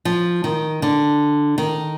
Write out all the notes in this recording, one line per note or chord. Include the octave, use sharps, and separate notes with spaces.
F3
D#3
D3
D#3